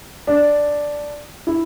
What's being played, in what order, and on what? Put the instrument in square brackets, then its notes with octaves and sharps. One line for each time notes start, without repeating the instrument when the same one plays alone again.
[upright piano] D4
E4